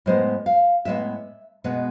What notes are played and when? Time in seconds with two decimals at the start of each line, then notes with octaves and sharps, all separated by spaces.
0.06 A2 G#3 B3 C5
0.46 F5
0.85 A2 G#3 B3 E5
1.64 B2 G#3 B3